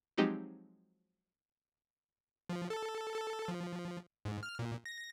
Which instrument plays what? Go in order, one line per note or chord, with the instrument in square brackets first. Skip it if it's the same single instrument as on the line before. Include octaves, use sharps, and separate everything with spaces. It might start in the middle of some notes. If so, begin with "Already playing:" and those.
[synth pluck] F3 F#3 G#3 C4 D#4 G4
[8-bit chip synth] F3
A4
A4
F3
G#2
F6
A#2
A#6